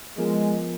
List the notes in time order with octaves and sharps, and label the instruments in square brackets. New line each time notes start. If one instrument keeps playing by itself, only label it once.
[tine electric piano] F3 B3 F4 A#4 [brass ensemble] G#3